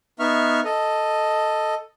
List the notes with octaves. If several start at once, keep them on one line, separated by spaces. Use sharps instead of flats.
B3 D#4 E5 C#6 F6
A4 D#5